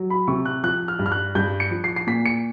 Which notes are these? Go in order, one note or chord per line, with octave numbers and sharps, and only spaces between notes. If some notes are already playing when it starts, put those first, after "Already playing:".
Already playing: F#3
B5
C3 C#6
F#6
F3 F#6
F6
G2
F6
F#6
G2 G6
C#7
F3
C7
C7
A#2 B6
C#7